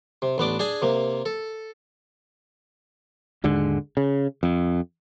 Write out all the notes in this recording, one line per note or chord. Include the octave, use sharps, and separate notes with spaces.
C3
A1 B3 D4 D6
D4 G#4 G#5
C3 A#3
A4
G#1 D#2 D3 G#3
C#3
F2